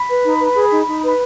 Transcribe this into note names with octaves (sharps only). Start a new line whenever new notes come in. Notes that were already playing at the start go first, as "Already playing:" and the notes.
Already playing: B5
B4
D#4
B4
G#4
D#4
D#4
B4 B5